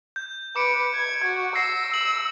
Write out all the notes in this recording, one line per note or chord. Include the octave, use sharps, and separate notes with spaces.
G6
B4 D6 C#7 D7
G#6
F#4
E6 A#6 C7
E6 F#7